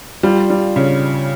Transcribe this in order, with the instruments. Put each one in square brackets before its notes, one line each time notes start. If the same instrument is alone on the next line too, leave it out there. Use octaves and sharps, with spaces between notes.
[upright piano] G3 [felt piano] F4
[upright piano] G3
C#3